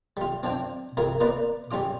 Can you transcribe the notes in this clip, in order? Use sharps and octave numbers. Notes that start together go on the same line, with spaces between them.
G3 F4
C4 D4 F4 G5
C2 F2 A#4 F5
A#3 F4 B4 D5
G3 C#4 F4 D6